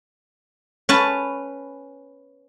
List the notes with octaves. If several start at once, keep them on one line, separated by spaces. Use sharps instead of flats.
C#4 B4 A5